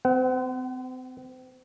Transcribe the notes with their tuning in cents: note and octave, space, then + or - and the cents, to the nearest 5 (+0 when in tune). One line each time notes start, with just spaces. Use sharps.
C4 -35 F#5 +35